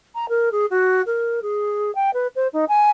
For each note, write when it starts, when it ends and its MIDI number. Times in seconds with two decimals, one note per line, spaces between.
0.14 0.26 82
0.29 0.49 70
0.52 0.66 68
0.70 1.02 66
1.06 1.40 70
1.42 1.93 68
1.95 2.10 79
2.14 2.27 71
2.35 2.47 72
2.53 2.65 63
2.68 2.90 80